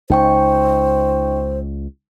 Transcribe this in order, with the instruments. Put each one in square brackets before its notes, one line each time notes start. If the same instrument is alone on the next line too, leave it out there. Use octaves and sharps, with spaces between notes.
[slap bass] C#2 [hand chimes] D#4 G5 C#6 [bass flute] C5